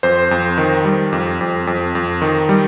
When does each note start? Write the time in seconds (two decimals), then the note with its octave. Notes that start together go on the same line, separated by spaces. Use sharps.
0.03 F2 C5
0.31 F2
0.58 D#3
0.85 G3
1.13 F2
1.41 F2
1.67 F2
1.95 F2
2.22 D#3
2.49 G3